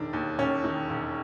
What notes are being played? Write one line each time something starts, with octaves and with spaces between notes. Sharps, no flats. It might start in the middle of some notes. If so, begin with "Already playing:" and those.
Already playing: E1 D#3 D4
D#2
E1 C#4
D#3
E1